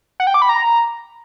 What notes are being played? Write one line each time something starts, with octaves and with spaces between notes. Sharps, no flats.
F#5
G5
D6
B5
A#5